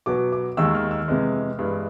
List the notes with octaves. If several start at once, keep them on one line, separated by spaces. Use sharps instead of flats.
B2 F#3 B3 D6
D6
D#2 D#3 G#3 E6
F6
E6
F2 C3 E3 G#3
G2 E3 G#3